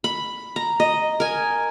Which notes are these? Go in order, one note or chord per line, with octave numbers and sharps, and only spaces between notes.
B5
A#5
D#5
A#4 G#5